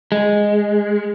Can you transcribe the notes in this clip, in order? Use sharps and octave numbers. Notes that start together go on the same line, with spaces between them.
G#3